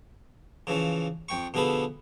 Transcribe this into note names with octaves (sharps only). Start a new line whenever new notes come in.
C#3 E3 F3 C#4
F2 G5 C#6
B2 D3 F3 G#4 A4 B4